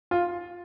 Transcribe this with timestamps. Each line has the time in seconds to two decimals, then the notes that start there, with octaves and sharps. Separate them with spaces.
0.11 F4